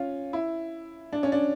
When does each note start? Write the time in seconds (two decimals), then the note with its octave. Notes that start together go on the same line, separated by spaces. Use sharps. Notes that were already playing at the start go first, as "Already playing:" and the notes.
Already playing: C#4 F4
0.33 E4
1.13 D4
1.23 C#4
1.32 D4